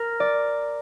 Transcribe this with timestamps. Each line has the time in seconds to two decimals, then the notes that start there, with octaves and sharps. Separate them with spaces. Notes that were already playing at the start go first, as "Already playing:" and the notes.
Already playing: A#4
0.20 D5